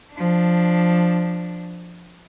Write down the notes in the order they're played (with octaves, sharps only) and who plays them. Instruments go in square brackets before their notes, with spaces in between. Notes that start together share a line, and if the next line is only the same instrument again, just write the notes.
[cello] F3 D4